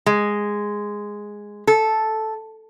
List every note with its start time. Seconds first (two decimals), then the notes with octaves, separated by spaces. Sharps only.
0.06 G#3
1.67 A4